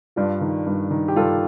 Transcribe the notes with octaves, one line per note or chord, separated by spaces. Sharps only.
G2 D4 F4
D#3
G2
D#3
G4
G2 F4 A4